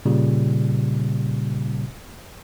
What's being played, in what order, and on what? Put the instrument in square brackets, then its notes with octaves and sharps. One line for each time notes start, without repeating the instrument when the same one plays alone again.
[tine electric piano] A#2 C#3 G3